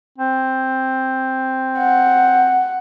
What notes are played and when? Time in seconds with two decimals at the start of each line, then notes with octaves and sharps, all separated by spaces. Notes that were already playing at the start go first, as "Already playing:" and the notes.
0.18 C4
1.79 F#5